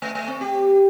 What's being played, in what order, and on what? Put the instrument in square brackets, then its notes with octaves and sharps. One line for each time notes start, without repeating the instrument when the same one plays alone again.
[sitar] A3
A3
C4
G4